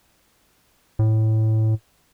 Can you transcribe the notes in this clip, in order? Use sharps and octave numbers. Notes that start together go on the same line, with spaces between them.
A2